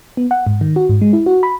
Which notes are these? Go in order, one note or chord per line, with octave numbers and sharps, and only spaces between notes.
B3
F#5
G#2
D#3
F#4
G#2
G#3
E4
F#4
B5